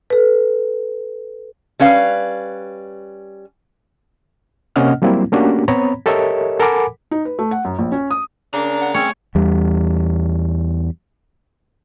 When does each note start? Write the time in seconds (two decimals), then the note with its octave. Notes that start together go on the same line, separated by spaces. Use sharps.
0.10 A4 B4
1.80 G3 C#4 B4 F5
4.76 C3 A#3 C#4 D#5 F#5 F6
5.02 F#3 G3 A#3 C4 E4
5.32 A3 A#3 C#4 D4 F#4 G4
5.68 B3 C4 C#5 A#5 B5
6.06 G4 A4 A#4 C#5 D#5 E5
6.59 A4 A#4 F#5 G#5 B5 D6
7.11 D#4
7.25 B4
7.39 A3
7.51 F#5
7.65 F#2
7.79 A#1
7.92 C#4
8.11 D#6
8.54 C#3 A#3 D4 A#5
8.81 F#5
8.94 A3 C4 C#4 G#4 C#5
9.35 E2 G3